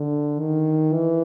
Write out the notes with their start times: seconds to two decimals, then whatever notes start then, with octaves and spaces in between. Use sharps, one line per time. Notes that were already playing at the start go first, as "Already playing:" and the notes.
Already playing: D3
0.40 D#3
0.93 E3